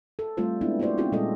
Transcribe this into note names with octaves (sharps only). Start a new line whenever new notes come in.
A4
G3 A3 C4 F4 G4 C5
G#3 B3 C4 D4 E4
A#3 E4 F#4 C5 D5
C4 C#4 D#4 F4 G4 G#4
A#2 G3 G#3 G4 A4 D#5